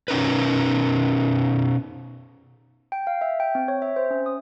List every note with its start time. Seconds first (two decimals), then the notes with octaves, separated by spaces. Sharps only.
0.08 B2 C#4 D#4 A#4 B4
2.92 G5
3.07 F5
3.21 E5
3.40 G5
3.55 C4
3.68 C#5
3.82 E5
3.96 C5
4.11 C#4
4.26 D#6